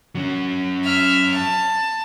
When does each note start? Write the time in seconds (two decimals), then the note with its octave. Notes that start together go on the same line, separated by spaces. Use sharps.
0.15 F#3 C#4
0.84 E5 F6
1.34 A5